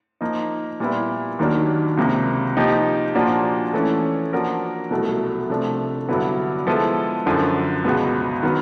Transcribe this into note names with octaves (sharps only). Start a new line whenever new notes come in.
F3 A#3 D#4
A#2 G3 B3 E4
D#2 D#3 F#3 A#3 D4
C#2 C3 F3 A#3
F3 A#3 D#4 G4
A#2 F3 A#3 D4 F#4
E3 A3 C#4
F3 A#3 D4 F#4 A#4
C2 B2 F#3 A3
C3 F3 A3 D4
G2 D3 F#3 B3 E4
F3 G#3 B3 E4 A4
F#2 D3 F3
C#2 B2 G#3 B3
D#3 F#3 B3